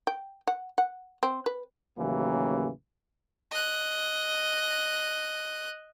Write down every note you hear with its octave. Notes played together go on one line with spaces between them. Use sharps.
G5
F#5
F#5
C4
B4
A1 D#2 C#3 E3 F#3 A#3
D#5 F#6